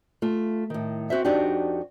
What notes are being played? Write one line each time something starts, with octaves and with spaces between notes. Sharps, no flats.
A3 F4
A2 D#3
C4 F#4 C5 E5
F2 D4 D#4 F#4 G4